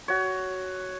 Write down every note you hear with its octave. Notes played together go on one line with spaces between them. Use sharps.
F#4 C#5